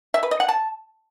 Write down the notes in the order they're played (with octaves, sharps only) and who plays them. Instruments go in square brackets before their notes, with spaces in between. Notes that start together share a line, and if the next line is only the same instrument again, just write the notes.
[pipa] E5
B4
D#5
F#5
A5